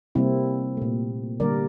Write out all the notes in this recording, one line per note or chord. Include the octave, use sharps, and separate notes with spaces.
C3 G3 A#3 C4 E4
A#2 A3
D3 G3 A#3 A#4 D5